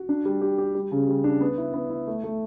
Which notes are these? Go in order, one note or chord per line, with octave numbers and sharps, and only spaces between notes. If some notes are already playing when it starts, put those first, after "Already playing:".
Already playing: F#4
D4
G3
G4
G4
G3
C#3
G3
D4
B3
E4
B3
E4
A3
A3